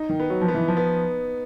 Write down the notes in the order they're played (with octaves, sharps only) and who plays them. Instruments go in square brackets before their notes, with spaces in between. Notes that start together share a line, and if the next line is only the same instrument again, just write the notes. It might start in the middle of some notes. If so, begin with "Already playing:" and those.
Already playing: [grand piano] D#4
[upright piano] D#3
[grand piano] B3
[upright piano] F#3
F3
[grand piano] B3
[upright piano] E3
F3
[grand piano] B3